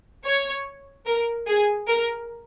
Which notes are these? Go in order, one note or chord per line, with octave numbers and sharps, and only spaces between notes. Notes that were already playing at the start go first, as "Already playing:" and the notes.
C#5
A#4
G#4
A#4